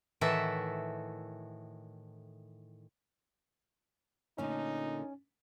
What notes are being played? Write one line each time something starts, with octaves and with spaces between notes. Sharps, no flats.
A2 D#3 E3 F#4 A4 E5
A#2 D3 A3 C#4 D#4